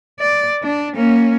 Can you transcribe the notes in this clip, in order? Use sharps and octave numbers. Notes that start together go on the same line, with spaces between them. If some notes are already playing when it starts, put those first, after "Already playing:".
D5
D4
A#3 C#4